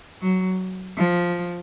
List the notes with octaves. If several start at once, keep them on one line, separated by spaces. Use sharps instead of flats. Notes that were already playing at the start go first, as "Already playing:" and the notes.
F#3
F3